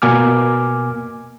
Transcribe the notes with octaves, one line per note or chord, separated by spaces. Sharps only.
B2 A#3 G#5 D6 F6